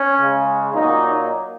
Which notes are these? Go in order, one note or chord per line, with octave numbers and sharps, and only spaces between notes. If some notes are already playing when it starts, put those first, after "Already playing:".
Already playing: C#4
C#3 G#3
A#2 F#3 A#3 D#4